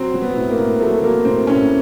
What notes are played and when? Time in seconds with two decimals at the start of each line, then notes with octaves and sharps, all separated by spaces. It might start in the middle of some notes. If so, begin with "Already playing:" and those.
Already playing: F#3 C4
0.14 F#3
0.22 B3
0.36 A2
0.51 A#3
0.58 A2
0.80 F#3 A3
1.03 F#3 A#3
1.25 A2 C4
1.47 A2 C#4